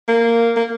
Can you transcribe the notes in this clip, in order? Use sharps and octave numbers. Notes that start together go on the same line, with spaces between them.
A#3
A#3